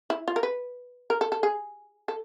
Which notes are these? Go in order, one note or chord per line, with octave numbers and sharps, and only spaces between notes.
E4
F4
A#4
B4
A#4
A4
A4
G#4
A4